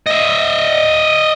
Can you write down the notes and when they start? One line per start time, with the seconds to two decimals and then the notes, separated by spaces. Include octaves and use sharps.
0.07 D#5 E5